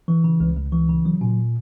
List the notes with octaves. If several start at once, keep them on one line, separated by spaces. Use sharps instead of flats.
E3
C#3
C#2
C#2
E3
C#3
F#3
A#2